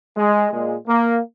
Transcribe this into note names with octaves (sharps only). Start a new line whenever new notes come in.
G#3
A#2 G#3
A#3